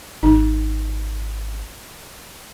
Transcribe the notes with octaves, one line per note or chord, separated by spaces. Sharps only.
G#1 D#4